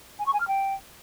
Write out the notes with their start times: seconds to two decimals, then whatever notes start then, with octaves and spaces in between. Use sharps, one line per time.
0.19 G#5
0.26 C#6
0.33 G#5
0.40 F6
0.47 G5